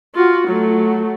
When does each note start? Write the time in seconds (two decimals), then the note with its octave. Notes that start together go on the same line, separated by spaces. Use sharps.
0.15 F4 F#4
0.48 F#3 A3